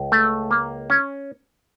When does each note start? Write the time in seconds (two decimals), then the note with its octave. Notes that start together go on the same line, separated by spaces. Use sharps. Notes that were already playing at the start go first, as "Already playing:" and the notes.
Already playing: C#2
0.12 A3
0.51 A#3
0.90 C#4